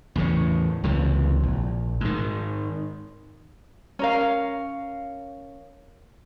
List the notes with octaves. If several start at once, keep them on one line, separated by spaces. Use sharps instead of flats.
E2 A2 C#3
C#2 C3 E3
A#1
G#2 D#3
C#4 A#4 F5